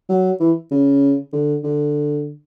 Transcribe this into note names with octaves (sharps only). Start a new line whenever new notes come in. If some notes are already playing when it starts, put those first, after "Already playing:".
F#3
E3
C#3
D3
D3